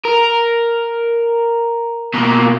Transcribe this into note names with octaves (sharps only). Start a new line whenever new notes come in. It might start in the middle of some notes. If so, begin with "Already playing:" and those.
A#4
B2 A#3